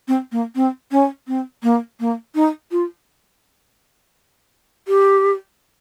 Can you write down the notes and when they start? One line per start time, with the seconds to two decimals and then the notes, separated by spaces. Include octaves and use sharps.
0.08 C4
0.32 A#3
0.56 C4
0.91 C#4
1.28 C4
1.63 A#3
2.00 A#3
2.35 D#4
2.72 F4
4.88 G4